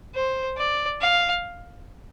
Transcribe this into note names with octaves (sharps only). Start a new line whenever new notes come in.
C5
D5
F5